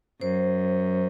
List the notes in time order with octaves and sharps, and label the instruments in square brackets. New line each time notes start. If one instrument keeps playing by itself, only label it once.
[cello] F#2 [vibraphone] C5